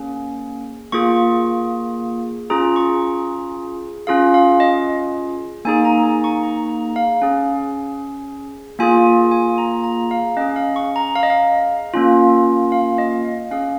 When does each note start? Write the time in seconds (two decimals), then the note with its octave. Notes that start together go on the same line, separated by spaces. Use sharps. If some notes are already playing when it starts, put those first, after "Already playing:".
Already playing: A#3 C#4 G#4
0.92 A#3 F4 G#4 C#6
2.50 C#4 F4 G#4 A#5
2.76 C#6
3.02 A#5
4.07 C#4 F4 G#4 F5
4.34 F5
4.60 D#5
5.65 A#3 D#4 G#4 G#5
5.85 A#5
6.03 G#5
6.24 C#6
6.43 A#5
6.69 A#5
6.96 F5
7.22 C#4 G#4
8.79 A#3 F4 G#4 G#5
9.31 G#5
9.58 A#5
9.84 A#5
10.11 F5
10.37 C#4 D#5
10.41 G#4
10.56 F5
10.76 C#6
10.96 A#5
11.15 F5
11.23 D#5
11.30 F5
11.94 A#3 C#4 F4
12.72 F5
12.98 D#5
13.25 F5
13.51 C#4 G#4 F5